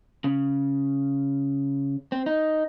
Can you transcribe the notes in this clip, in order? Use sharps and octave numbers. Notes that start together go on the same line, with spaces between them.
C#3
C4
D#4